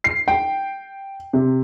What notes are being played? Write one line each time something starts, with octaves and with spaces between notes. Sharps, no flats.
C7
G5
C3